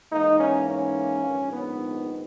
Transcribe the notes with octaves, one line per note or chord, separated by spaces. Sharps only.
G#2 E3 A#3 D#4
C#4
C#4
A#1 G#2 D#3
B3